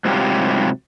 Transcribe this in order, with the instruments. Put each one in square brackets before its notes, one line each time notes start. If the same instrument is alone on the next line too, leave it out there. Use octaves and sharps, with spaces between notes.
[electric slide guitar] G#2 C3 F#3 G3 F4 G4